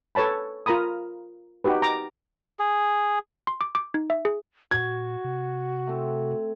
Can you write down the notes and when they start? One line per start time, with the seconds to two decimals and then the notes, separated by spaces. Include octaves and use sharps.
0.15 A4 B4 C#5 A5 B5
0.66 F4 A#4 A#5 B5 D#6
1.64 D#4 F#4 G4 B4
1.82 A#5 D6
2.59 G#4
3.47 C6
3.61 D6
3.75 D6
3.94 D#4
4.10 E5
4.25 G#4
4.71 A#2 F#4 G#6
5.24 C3
5.87 A3 C4